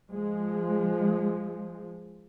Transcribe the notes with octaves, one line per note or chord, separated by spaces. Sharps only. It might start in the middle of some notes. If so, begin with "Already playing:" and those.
F3 G#3